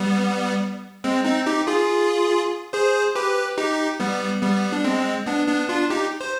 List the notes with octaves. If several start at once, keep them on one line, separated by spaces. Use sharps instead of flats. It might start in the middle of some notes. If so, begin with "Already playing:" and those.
Already playing: G3 B3
G#3 C4
C4 D#4
D#4 G4
F4 G#4
G#4 C5
G4 B4
D#4 G4
G3 B3
G3 B3
D4
G#3 C4
B3 D4
B3 D4
D4 F4
D#4 G4
C5